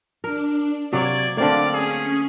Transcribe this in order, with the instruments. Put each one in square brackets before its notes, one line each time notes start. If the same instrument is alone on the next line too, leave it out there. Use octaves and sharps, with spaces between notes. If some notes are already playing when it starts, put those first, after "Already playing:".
[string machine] D4 [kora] A#4
[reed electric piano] C3 [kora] F#3 A#3 C#5 [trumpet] D5 [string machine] G#6
[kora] D3 A#3 [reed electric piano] A3 C4 [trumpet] D5 [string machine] F5
[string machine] C#4 [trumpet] G#4